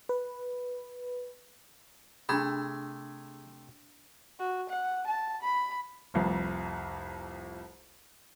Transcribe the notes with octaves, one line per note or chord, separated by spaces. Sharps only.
B4
C3 A3 D4 G#4 B5
F#4
F#5
A5
B5
F1 C2 F2